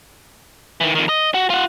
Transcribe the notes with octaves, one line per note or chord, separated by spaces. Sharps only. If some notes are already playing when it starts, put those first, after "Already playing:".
D#3 E3
F2 D#3
D#5
F#4
F4 F#5